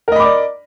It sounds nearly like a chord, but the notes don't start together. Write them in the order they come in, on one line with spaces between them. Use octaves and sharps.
A#4 D#5 B5 D6 D5